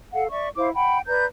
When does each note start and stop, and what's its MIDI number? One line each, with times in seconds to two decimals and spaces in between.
0.13 0.27 69
0.13 0.27 77
0.13 0.27 78
0.29 0.49 74
0.29 0.49 76
0.29 0.49 85
0.56 0.69 64
0.56 0.69 72
0.56 0.69 77
0.56 0.69 86
0.74 1.00 78
0.74 1.00 79
0.74 1.00 83
1.07 1.25 71
1.07 1.25 74
1.07 1.25 82
1.07 1.25 91